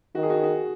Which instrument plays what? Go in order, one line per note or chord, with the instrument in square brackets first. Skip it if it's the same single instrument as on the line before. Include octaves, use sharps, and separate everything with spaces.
[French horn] D#3 [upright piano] F#4
[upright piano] G#4
F#4
G#4
F#4